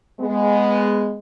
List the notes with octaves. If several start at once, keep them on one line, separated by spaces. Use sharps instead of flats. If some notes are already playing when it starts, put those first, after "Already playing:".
G#3 B3